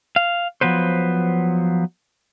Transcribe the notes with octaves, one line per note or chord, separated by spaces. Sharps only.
F5
F3 F#3 B3 B4 C5